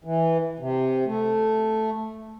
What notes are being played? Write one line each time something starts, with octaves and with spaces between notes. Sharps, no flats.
E3
C3
A3